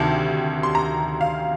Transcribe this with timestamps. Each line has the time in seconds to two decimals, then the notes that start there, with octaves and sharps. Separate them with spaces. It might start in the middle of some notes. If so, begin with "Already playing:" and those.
Already playing: D2 C3 D#3 A5
0.63 C6
0.75 A#5
1.21 F5